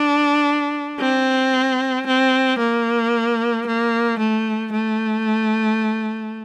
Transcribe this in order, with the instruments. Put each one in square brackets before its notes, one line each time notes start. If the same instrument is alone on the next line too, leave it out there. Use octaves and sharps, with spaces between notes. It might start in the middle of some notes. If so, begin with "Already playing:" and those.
Already playing: [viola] D4
C4
C4
A#3
A#3
A3
A3